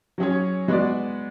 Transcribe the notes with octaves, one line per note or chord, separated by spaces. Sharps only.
F#3 C#4 G#4 C#5
G#3 B3 F#4 B4 D5